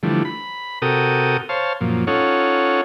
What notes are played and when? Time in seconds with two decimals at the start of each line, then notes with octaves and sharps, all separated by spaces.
0.03 D3 E3 F3 G3 A3
0.25 B5
0.82 C3 F#4 A4 A#4 G5 D#6
1.49 C5 C#5 F5 A5
1.81 F#2 A#2 F3
2.07 C#4 D#4 F4 A4 C#5 F#5